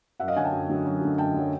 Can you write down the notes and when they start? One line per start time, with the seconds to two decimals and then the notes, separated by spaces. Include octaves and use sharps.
0.20 F#2 E5 F#5
0.28 D#5 F5
0.36 D3 F#3 F#5 G#5
0.44 G5 A5
0.52 F#2
0.69 D3 F#3
0.86 F#2
1.01 D3 F#3
1.18 F#2 G5 A5
1.34 D3 F#3